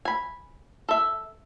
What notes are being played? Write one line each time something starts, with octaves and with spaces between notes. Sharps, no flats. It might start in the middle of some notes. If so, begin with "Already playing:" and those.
G#5 B5
A4 E5